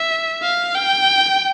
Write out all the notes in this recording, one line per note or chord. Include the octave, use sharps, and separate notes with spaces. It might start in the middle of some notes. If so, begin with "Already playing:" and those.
Already playing: E5
F5
G5